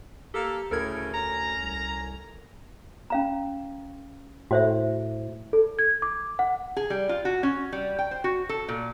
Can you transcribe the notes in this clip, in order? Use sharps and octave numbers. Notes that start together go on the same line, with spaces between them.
A#3 G4 A4
D2 A2 C#3 A4 A#4 G#6
C#4 A#5
C2
C#4 F5 A#5
A2 F#4 C5 E5
A4
G#6
D6
F#5
G#4
G3
F4
F#4
C#4
G3
G5
C5
F#4
A4
A#2